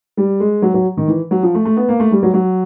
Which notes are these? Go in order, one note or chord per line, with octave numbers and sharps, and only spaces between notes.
G3
G#3
F#3
F#3
D#3
E3
F#3
F3
A3
A3
B3
A#3
A3
G3
F#3
F#3